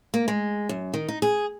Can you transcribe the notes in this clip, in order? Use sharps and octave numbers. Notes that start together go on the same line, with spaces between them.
A#3
G#3
F#2
D#3
D#4
G#4